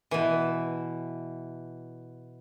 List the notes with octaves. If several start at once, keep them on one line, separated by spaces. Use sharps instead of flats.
B2 E3